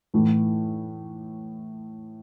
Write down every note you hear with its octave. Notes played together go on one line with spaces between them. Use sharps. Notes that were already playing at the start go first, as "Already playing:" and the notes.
A2 E3 A3